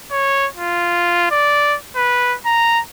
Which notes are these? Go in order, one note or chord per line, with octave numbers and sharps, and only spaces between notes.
C#5
F4
D5
B4
A#5